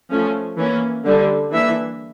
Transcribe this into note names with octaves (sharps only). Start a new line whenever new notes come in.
F3 A3 C#4
E3 A#3 C#4
D3 G3 D4
E3 A#3 D4 E5